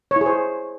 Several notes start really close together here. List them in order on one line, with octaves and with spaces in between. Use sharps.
C#5 E4 G#4 C5